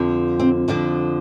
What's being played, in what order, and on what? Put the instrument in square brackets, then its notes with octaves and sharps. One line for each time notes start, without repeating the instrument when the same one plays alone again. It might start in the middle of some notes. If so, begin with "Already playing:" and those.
Already playing: [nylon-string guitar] F2 D3 F3
C4
F2 D3 F3 D4